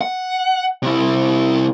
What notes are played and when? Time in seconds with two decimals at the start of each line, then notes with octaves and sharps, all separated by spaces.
0.01 F#5
0.82 C3 E4